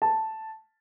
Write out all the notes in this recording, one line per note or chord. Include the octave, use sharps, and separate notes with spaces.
A5